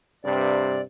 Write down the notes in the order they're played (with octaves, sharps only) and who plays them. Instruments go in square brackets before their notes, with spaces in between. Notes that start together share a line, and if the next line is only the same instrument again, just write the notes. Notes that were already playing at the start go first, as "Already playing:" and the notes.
[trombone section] G2 C3 [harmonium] D5